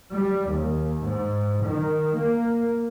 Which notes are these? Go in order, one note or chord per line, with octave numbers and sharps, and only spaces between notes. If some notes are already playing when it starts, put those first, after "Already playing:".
G3
D#2
G#2
D#3
A#3